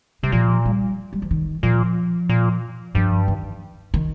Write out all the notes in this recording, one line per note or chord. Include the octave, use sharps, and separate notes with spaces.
C3 G3
A#2 F3
G3
G3
F3
D#3
A#2 F3
A#2
G2 F3
D#3
D#3